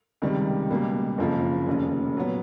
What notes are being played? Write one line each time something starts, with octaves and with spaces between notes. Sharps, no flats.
C#2 C3 D#3 G3
C#2 B2 G3 A#3
F#1 F2 C#3 F3 A#3
F1 D#2 C#3
A#2 F#3 B3